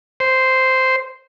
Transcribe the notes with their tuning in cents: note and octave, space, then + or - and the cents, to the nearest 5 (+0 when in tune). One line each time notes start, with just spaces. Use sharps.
C5 -5